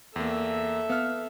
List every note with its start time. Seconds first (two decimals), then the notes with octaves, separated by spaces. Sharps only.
0.16 E2 A#3 A4 E5
0.90 B3 F5 F6